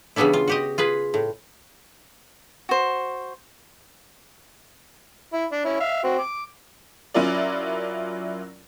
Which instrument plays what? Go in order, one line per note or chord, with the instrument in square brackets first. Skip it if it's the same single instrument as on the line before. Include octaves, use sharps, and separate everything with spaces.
[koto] C#3 E3 G3 B3 D4 E4
F4
F#4 G4 D#5
F4 G#4 B4
A2
[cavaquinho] F#4 C5
[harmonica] E4
D4
C#4 E4
E5 F5
C4 F#4
D6
[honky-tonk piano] F#3 C#4 E4 F4 A#4 D5